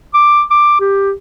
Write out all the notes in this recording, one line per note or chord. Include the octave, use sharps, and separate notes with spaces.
D6
D6
G4